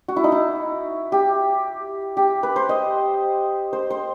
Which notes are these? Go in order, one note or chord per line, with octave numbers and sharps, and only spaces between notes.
F#4
E4
D#4
E4
G4
G4
B4
C5
D#5
C5
C5